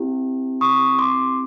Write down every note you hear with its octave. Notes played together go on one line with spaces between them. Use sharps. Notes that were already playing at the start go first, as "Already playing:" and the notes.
Already playing: C4 E4 G4
C#6 D#6
C6 D6